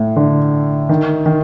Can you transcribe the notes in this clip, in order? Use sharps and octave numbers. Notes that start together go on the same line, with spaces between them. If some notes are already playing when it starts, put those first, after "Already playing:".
Already playing: A2
D3
D#3
D#3